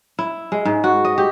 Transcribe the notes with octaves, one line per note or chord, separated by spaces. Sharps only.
E4
G#3
G#2
F#4
D#5
G4